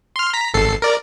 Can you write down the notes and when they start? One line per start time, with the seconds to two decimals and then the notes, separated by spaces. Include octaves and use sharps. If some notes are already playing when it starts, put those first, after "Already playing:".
0.16 C6 F6
0.33 A#5 B6
0.54 G#1 A4 C7
0.82 A#4 D5